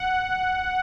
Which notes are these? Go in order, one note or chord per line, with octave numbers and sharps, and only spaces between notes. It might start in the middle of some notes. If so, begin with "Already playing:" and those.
Already playing: F#5